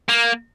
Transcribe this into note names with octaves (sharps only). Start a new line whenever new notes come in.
A#3